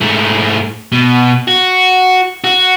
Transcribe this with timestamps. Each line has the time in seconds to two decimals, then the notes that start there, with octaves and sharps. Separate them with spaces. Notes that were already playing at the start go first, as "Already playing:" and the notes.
0.01 G#2 A3
0.92 B2
1.47 F#4
2.44 F#4